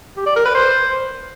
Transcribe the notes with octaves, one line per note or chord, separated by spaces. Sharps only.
G4
D5
A#4
B4
C5